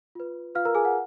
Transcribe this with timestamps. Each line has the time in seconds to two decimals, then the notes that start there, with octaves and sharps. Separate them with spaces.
0.15 F4 B4
0.55 F4 B4 F5 F6
0.65 A#4 A#5
0.75 G#4 G#5
0.85 F#5